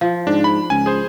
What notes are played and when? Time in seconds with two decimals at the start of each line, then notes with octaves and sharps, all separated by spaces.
0.01 F3
0.27 G#2 D4
0.44 B5
0.70 C#2 G#5
0.86 G#4 C5